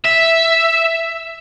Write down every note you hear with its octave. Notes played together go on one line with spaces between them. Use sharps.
E5